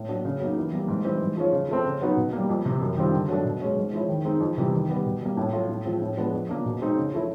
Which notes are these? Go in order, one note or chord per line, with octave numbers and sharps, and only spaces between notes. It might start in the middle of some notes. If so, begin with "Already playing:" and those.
Already playing: A2
F#3 A#3 D4
C#3
F#3 A#3 D#4
E3
G3 A#3
G#2
E3 G3 C4
G#2
F3 G#3 C#4 F4
C#3
F3 A3 C4
C#3
F#3 B3 D#4 F#4
B2
G3 A#3
F2
C3 E3
F#2
D#3 G3 C4 F4
D3
F#3 A3 D4
B2
G#3 C#4
G#2
F3 G#3 C#4 E4
D#3
G#3 C4 D#4
F2
C3 E3 G3 C4
D#3
G3 B3
B2
G3 A#3
A2
F#3 A3 C#4 F4
A2
F3 G#3 C4 F4
A2
F3 G#3 B3 D4
F2
C#3 F3 A#3 D4
B2
G#3 C4 D#4
C#3
F3 A3 C#4 E4